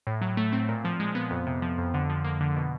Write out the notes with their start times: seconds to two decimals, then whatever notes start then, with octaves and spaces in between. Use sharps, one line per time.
0.07 A2
0.21 F#3
0.37 A3
0.53 C4
0.68 A#2
0.85 F3
1.00 G#3
1.15 B3
1.31 F2
1.47 C3
1.62 F3
1.78 F2
1.94 D3
2.09 F3
2.24 A#3
2.41 D3
2.56 B2